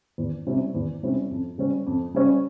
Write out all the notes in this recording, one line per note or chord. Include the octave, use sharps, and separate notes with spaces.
E2
C3 G3 C#4 E4
E2
C3 G3 C#4 E4
F2
C#3 G3 C#4
F2
C#3 G3 C#4